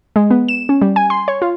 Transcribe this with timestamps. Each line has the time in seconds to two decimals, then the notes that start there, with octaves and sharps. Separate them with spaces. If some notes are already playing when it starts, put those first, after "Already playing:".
0.16 G#3
0.31 B3
0.48 E7
0.69 C#4
0.82 G3
0.96 G#5
1.10 C6
1.28 C#5
1.42 F4